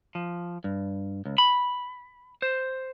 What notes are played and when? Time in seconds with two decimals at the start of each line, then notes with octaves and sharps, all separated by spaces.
0.15 F3
0.64 G2
1.25 C#2
1.38 B5
2.42 C5